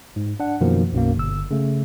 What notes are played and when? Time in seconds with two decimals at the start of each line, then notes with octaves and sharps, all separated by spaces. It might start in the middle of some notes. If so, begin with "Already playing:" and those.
0.16 G#2
0.40 D4 F#5
0.61 F#2 B2 D#3 F3 A#3
0.93 B1 F#2 B2 A#3
1.16 G1 E6
1.51 C#3 A3